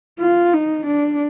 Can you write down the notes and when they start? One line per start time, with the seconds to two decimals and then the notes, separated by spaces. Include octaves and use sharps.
0.20 F4
0.54 D#4
0.86 D4